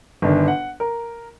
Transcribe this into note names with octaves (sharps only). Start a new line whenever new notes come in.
G1 D#3 D4
F#5
A#4